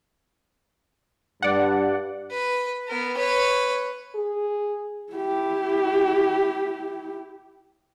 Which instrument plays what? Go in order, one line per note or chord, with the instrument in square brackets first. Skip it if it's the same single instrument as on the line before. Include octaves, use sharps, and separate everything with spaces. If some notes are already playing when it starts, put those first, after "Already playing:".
[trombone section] G2 [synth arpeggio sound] D5 F#5
[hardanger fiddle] B4
B3 A#4
B4 C#5
[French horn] G#4
[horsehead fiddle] E4 G4